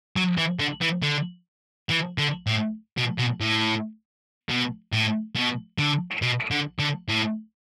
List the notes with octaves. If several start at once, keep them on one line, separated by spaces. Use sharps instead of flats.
F#3
E3
D3
E3
D3
E3
D3
A2
B2
B2
A2
B2
A2
B2
D3
B2
D3
D3
A2